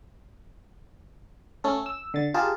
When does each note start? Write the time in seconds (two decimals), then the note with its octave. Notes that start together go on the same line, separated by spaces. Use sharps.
1.64 A3 C#4 A4
1.86 E6
2.14 D3 A6
2.34 F4 G4 G#4 A#4 A5